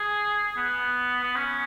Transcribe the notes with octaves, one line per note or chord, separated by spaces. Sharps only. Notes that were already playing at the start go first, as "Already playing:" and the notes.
Already playing: G#4
B3
B3
C#4